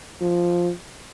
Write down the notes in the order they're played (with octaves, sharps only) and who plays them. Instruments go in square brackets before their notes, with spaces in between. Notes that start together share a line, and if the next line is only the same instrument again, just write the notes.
[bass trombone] F3